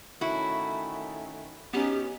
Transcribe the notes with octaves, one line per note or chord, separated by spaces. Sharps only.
D#3 A3 C#4 E4 F#4
F#3 B3 C#4 D#4 G4